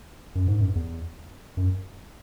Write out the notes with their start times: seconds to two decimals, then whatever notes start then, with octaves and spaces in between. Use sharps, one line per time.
0.35 F#2
0.48 G#2
0.61 F#2
0.75 E2
1.57 F#2